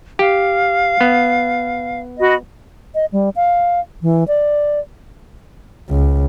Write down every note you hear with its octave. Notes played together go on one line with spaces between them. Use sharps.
G4 F5
B3
F#4 D#5 B5
D#5
G3
F5
E3
D5
C#2